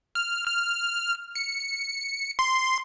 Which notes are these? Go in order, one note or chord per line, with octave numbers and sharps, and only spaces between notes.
F6
F6
C#7
C6